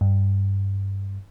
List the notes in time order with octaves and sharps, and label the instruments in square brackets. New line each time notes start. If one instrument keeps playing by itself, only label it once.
[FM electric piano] G2